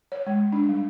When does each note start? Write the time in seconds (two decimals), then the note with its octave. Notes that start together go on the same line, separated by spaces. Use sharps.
0.12 C#5
0.27 G#3
0.53 D4
0.69 G3